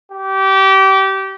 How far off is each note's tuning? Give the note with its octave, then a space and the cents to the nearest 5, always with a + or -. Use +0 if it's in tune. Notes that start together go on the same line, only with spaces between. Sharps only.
G4 -25